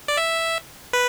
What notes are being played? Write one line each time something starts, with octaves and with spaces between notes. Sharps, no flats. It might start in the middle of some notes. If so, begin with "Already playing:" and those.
D5
E5
B4